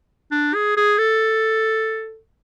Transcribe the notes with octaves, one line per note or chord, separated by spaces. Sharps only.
D4
G#4
G#4
A4